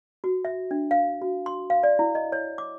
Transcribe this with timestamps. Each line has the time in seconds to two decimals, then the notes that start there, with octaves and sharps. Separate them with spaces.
0.24 F#4
0.45 E5
0.71 D4
0.91 F5
1.22 F#4
1.46 C6
1.70 F5
1.83 D5
1.99 E4
2.15 D#5
2.32 C#5
2.58 D6